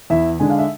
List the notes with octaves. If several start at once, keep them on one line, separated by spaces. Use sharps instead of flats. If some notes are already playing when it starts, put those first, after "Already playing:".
E2 E4 E5
D3 G#3 D4 G#5
F5
E5